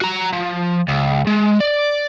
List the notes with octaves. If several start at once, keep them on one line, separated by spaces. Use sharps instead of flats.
F#4 A#5
F3
C#2
G#3
D5